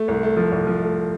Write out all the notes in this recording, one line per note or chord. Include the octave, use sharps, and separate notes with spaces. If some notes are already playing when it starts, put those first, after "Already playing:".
Already playing: A3
C2
A3
F3
C2
F3
A3